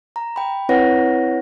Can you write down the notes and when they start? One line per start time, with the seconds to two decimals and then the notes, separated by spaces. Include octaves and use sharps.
0.16 A#5
0.36 G5 B5
0.69 C4 E4 B4 C#5 F#5 A#6